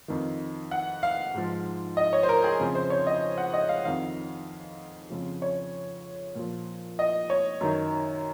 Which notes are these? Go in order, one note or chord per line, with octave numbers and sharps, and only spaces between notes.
F2 D#3
F#5
F5
G#2 F3
D#5
C#5
C5
A#4
G#4
F2 C#3 F3
C5
C#5
D#5
F#5
D#5
F5
F2 D#3 F5
F2 C#3 F3
C#5
A#2 F3
D#5
C#5
F#2 D#3